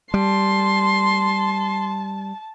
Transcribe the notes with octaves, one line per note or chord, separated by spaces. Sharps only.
G3 A5 C6